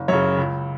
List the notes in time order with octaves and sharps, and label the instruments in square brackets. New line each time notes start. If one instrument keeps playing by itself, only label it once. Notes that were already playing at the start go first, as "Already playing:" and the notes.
Already playing: [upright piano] F#1
F#2 C#3 C#5
C#2